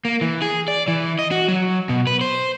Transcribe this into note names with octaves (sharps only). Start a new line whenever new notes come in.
A#3
E3
G#4
D5
E3
D#5
F#4
F#3
B2
B4
C5